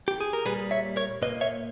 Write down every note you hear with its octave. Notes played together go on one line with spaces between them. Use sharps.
G4
G#4
A#4
A#2 G3 A#3 G#4 B4
C#5 E5
A#4 C#5
A#2 A#3 B4 D#5
C#5 E5